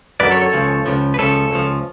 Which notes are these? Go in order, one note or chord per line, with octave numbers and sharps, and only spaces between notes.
F#2 D3 F#3 B4 D5
A4 C#5
A4 C#5
C#2 C#3 F3
C#2 C#3 F3
B4
C#2 C#3 F3 A4 C#5
C#2 C#3 F3